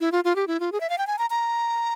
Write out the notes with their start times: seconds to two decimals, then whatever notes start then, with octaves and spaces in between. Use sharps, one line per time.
0.01 E4
0.12 F4
0.24 F4
0.36 G4
0.47 E4
0.60 F4
0.72 G#4
0.80 E5
0.90 F5
0.98 G5
1.07 G#5
1.18 A#5
1.30 A#5